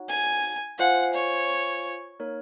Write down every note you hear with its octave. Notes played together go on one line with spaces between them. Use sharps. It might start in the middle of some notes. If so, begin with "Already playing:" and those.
Already playing: D#4 F#4 C#5 F#5
G#5
F4 C5 F5 F#5 G#5
C#5
A#3 D#4 A#4 C#5